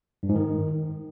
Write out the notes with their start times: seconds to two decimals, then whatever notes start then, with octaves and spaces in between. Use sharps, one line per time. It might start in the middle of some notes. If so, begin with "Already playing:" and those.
0.23 G2
0.29 G#2
0.35 D#3